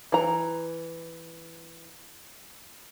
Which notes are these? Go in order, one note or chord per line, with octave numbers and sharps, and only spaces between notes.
E3 A#5